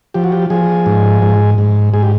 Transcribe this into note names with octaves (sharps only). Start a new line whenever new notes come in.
F3 G4
F#4
G4
F3 G#4
G#2
G#2
G#2
G#2 G#4
G4